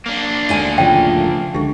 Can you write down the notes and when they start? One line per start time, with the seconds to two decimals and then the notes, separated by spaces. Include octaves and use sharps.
0.06 A#3 D4
0.49 D2 A3 G#5
0.78 G1 C#3 F3 G5
1.54 C#2 D3 G4